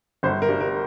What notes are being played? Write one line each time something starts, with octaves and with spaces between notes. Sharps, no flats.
G1 C5
A#4
G2
A#4